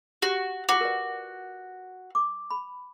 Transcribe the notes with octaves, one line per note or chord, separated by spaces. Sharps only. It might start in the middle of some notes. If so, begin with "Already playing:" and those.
F#4 G4
F4 F#4 F#5 D6
A#4 B4 D5
D6
B5